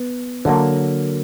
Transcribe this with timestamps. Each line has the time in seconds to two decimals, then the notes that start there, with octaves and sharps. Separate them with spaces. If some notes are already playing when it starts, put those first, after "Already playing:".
Already playing: B3
0.45 D3 F#3 A#3